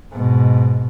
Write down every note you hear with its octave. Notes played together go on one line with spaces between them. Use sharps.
G#2 B2